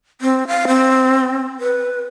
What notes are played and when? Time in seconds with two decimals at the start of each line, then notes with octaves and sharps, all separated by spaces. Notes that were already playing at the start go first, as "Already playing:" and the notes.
0.21 C4
0.48 F5
0.68 C4
1.60 B4